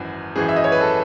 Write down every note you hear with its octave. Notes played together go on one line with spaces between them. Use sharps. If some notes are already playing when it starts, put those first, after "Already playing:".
Already playing: G#1 F#2 E3 F#4
G#1 F#2 E3 G#4
E5
D#5
C#5
B4
A4